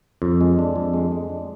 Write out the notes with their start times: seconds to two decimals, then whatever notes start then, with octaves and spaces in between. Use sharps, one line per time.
0.22 F2
0.41 G#3
0.59 D4
0.76 F2
0.94 G#3
1.12 G#3
1.30 D4